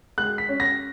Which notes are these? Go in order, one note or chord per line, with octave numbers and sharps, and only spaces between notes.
G#3 F#6
B6
C#4
A#6